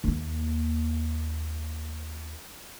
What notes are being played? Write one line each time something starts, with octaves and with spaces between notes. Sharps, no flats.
D#2 A#3